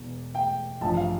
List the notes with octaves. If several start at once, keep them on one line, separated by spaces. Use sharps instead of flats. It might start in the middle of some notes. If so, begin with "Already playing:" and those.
Already playing: E1 E2
G5
A1 G2 F3 A5
F5